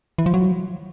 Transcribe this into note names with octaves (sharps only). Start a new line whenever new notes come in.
E3
F3
F#3